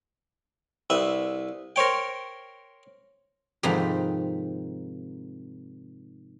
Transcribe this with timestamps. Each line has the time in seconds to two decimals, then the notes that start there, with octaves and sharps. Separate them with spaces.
0.90 C2 B4 E5
1.76 A#4 C5 C#5 G5
3.63 F2 G#2 C3 D#3 D#4 B5